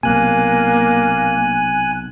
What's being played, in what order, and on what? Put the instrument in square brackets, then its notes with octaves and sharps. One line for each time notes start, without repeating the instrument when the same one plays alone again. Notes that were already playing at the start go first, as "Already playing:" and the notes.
[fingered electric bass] B1 C3 [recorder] A#3 [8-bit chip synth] G#5 F#6